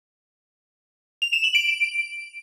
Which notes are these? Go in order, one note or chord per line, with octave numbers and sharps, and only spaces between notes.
F7
E7
F#7
D7